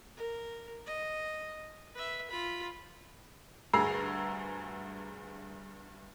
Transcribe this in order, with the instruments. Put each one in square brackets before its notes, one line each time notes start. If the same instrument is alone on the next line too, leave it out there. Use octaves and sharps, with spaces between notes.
[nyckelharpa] A#4
D#5
B4 E5
F4 B5
[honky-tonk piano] D2 G2 G#4 A#5 E6 C7